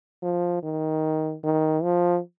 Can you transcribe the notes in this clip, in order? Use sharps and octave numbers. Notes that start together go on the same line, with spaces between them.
F3
D#3
D#3
F3